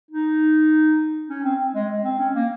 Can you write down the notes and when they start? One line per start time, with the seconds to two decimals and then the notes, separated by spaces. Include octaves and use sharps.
0.11 D#4
1.29 C#4
1.44 C4
1.75 G#3
2.04 C4
2.19 C#4
2.35 A#3